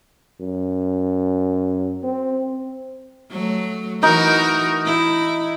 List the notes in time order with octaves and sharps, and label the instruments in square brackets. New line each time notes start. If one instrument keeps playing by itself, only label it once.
[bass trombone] F#2
C4
[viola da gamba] F#3 A3
[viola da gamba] E3 F#4 A#4 [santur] D#4
[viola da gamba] E4